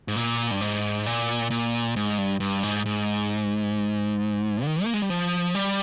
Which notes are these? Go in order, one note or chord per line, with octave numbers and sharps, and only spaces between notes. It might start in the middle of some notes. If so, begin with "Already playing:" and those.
G#2
A#2
G2
G#2
A#2
A#2
G#2
G2
G2
G#2
G#2
D#3
A#3
G#3
G3
F3
G3